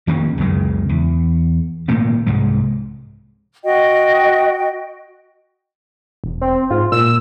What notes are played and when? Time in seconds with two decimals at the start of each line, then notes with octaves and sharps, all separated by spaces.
0.07 F2 D#3 A#3 C#4
0.38 C#2 F#2 C#3 G#3
0.89 E2
1.88 G#1 A#2 A3 A#3
2.27 C2 G#2 G#3
3.65 F#4 D#5 G5
6.24 E1
6.41 C4
6.71 G#2 F4
6.92 A#2 E6